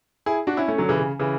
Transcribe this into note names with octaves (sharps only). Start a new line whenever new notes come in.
E4 G#4
D4 F#4
C#4 E4
A3 C#4
D3 F#3
C#3 E3
C#3
C#3 E3